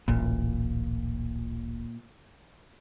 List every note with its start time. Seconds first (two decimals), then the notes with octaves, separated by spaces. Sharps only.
0.08 D1 A1 A#2